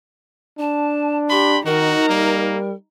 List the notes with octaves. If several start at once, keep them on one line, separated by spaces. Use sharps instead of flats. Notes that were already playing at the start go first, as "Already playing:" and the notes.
D4 A5
G4 B5 C6
D#3 D#4 F#4 A#4 A#5
G3 A#3